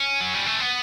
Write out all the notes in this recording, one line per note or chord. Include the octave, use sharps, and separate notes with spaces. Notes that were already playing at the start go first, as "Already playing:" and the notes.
Already playing: C#4
F#3
G3
A3
B3